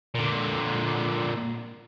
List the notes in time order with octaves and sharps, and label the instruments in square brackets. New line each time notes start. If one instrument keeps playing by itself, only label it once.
[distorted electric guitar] A#2 D3